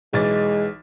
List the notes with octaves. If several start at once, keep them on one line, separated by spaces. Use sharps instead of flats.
B1 E3 G#3 A6